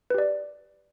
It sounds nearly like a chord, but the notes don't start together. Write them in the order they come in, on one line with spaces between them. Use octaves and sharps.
B4 G4 D5